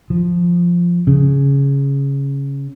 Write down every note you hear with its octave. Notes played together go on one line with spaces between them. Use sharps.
F3
C#3